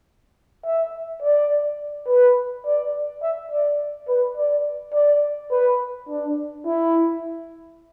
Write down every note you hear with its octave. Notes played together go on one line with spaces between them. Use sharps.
E5
D5
B4
D5
E5
D5
B4
D5
D5
B4
D4
E4